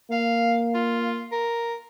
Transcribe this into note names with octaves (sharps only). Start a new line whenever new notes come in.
A#3 F5
F4
A#4